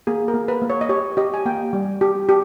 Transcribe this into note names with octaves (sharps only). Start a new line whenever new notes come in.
A#3 G#4
A#4
A#3
B4
A#3
C#5
D#5
G4 C#5
G4 D#5
G#5
A#3 G5
G3
G4
G4